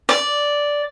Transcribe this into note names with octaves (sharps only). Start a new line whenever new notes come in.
D5